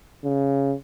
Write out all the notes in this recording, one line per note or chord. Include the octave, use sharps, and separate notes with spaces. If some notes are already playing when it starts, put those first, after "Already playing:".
C#3